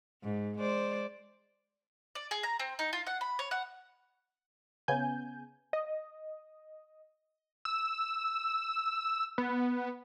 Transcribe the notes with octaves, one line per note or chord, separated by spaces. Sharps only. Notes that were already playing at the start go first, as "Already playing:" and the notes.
G#2
G#3 C5 D5
D5
G#4
A#5
C4
D#4
F4
F#5
B5
C#5
F#5
C#3 B3 G#5 G6
D#5
E6
B3